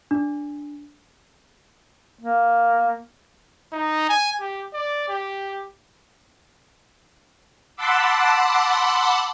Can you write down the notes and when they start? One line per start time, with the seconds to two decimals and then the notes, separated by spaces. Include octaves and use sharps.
0.11 D4
2.19 A#3
3.73 D#4
4.09 G#5
4.41 G4
4.73 D5
5.09 G4
7.76 F#5 A5 B5 C6 D6 E6